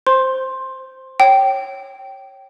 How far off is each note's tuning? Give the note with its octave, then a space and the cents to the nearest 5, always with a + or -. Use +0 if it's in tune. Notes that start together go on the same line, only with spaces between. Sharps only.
C5 +0 C6 +15
C#5 -15 G5 -15